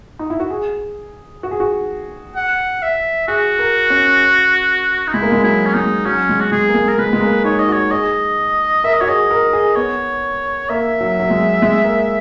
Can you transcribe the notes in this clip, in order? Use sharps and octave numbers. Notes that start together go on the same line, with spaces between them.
D#4
E4
F#4
G#4
F#4
G#4
F#4
F#5
E5
F#4 G#4
A#4
C#4
D#4
G#3 E4
A#3
G#3
F#3 E4
C#4
G#3 D#4
F#3 C#4
G#3
F#4
G#3 G#4
A#3
G#3
A#4
G#3 B4
G#3
A#3
D#4 C#5
D#5
F#4
C#5
G#4 D#5
A#4 E5
D#5
F#4 C#5
G#4 D#5
A#4
G#4
B3 C#5
A#3 E5
F#3
F#3
G#3
G#3
A#3